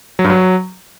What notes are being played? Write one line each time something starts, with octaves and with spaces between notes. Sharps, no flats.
F#3
G2
F#3